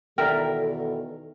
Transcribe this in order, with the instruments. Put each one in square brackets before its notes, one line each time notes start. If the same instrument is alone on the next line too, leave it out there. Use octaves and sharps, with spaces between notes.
[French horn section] E2 B2 D#3 [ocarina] A4 [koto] A#4 [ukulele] D5 E5 G5